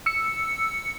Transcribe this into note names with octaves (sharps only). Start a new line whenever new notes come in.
E6 C#7